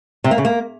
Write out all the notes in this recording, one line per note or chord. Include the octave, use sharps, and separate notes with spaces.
C3
A#3
C#3
A#3